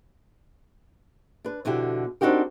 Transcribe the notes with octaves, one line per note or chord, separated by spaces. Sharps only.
D4 B4
F2 B2 D3 E4 G4
C4 D4 D#4 F#4 G4 A#4